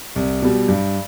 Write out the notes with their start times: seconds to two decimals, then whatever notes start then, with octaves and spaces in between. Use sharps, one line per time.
0.16 C2
0.42 B2 G3
0.68 G2